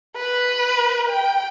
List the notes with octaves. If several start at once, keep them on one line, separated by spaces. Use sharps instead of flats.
B4
G5